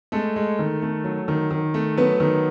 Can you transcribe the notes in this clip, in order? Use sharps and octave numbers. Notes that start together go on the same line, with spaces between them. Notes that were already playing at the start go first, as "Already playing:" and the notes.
G#3 A3 A4
G#3
D#3
A3
F#3
D#3
D#3
A3
F#3 B3 B4
D#3